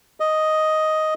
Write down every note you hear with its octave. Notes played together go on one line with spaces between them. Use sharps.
D#5